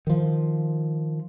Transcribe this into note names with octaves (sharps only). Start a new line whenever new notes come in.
D#3 F3